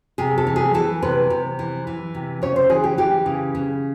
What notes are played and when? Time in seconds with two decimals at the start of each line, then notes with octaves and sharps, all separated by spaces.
0.18 C3 G#4
0.38 A4
0.47 E3
0.56 G#4
0.74 E3 A4
1.02 C3 B4
1.30 C3
1.59 E3
1.87 E3
2.14 C3
2.42 C#3 C#5
2.56 C5
2.70 E3 G#4
2.84 G4
2.98 E3 G4
3.26 C#3
3.55 C#3